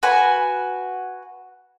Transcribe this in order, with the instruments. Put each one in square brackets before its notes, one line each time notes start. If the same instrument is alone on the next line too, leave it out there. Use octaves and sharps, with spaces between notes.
[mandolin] F#4 B4 G#5